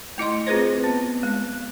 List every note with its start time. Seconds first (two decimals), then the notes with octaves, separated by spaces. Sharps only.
0.18 A3 E4 D#5 C6
0.47 C4 F4 G#4 B4 C5
0.84 B3
1.23 G#3